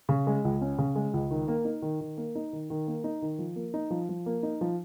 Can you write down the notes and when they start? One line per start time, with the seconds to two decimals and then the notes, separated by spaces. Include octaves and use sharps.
0.09 C#3
0.27 G#3
0.45 C#2
0.61 C#4
0.78 C#3
0.95 G#3
1.14 C#2
1.31 D#3
1.48 A#3
1.65 D#4
1.82 D#3
2.01 D#3
2.18 A#3
2.35 D#4
2.53 D#3
2.70 D#3
2.88 A#3
3.04 D#4
3.22 D#3
3.39 F3
3.56 A#3
3.74 D#4
3.90 F3
4.09 F3
4.26 A#3
4.43 D#4
4.61 F3